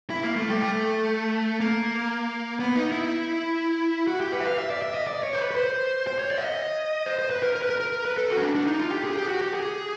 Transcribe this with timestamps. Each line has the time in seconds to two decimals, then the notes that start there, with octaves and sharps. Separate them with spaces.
0.10 E4
0.23 A#3
0.36 A3
0.48 G3
0.61 A3
1.60 A#3
2.60 B3
2.76 D#4
2.92 E4
4.07 F#4
4.21 G4
4.32 B4
4.41 E5
4.45 F5
4.58 E5
4.70 D5
4.82 E5
4.94 D#5
5.07 D5
5.23 C#5
5.33 C5
5.41 B4
5.51 B4
5.56 C5
6.07 C5
6.19 C#5
6.31 D5
6.37 E5
6.44 D#5
7.06 C5
7.19 C5
7.30 B4
7.43 A#4
7.55 A#4
7.62 B4
7.70 A#4
7.80 A#4
8.05 B4
8.17 A4
8.30 F#4
8.37 C#4
8.42 D4
8.55 D4
8.67 D#4
8.79 F4
8.92 G4
9.05 G#4
9.17 G4
9.29 F#4
9.42 G4
9.54 G#4